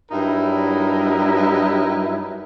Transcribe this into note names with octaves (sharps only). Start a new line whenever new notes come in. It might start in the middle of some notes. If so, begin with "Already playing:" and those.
G2 F#3 G3 D#4 E4 A#4